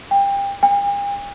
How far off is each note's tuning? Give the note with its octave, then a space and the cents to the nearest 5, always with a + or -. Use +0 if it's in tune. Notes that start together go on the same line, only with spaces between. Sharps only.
G5 +25
G5 +45